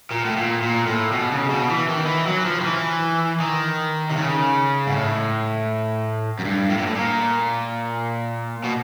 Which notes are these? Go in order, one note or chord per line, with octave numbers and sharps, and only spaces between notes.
A#2
A2
A#2
A#2
A2
B2
C#3
B2
E3
D#3
E3
F#3
F3
D#3
E3
D#3
C3
C#3
G#2
A2
F#2
G2
A2
A#2
A2
A#2
B2